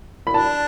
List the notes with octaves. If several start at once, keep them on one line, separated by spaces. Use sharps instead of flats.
B5
D4 A5